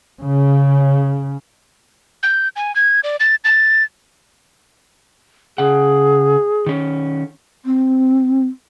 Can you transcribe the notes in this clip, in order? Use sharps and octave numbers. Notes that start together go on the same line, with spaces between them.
C#3
G6
G#5
G#6
D5
A6
A6
C#3 G#4 F#5
D#3 C#4
C4